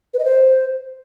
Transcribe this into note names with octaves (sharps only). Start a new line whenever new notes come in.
B4
D#5
C5